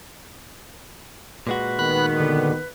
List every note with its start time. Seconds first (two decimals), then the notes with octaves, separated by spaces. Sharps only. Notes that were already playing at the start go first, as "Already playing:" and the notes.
1.47 A#2 G#3 F#4 B4
1.79 D#3 B3 B5 F#6
2.20 D3